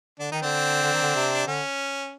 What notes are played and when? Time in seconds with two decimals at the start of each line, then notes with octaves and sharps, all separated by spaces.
0.19 D3 D4
0.32 D#3 D#4
0.42 D3 C4 D4
0.83 D3
0.93 D#3
1.02 D3
1.15 C3
1.46 D3 C#4